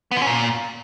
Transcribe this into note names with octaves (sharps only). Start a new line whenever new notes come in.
B3
D3
C#4
A#2